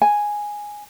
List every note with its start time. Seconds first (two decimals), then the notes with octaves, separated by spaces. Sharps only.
0.02 G#5